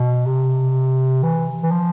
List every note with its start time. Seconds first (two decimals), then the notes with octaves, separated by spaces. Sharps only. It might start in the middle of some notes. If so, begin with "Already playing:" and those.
Already playing: B2
0.26 C3
1.23 E3
1.63 E3
1.71 F3